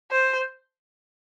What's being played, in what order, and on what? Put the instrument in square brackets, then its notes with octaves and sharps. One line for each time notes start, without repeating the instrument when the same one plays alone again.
[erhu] C5